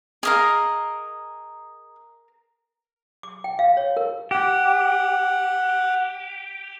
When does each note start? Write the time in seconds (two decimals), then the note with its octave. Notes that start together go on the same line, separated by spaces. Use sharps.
0.23 G#4 A#4 D#5 F5 F6
3.23 D6
3.44 G5
3.59 F5
3.77 C#5
3.97 A#4
4.31 G4 F#5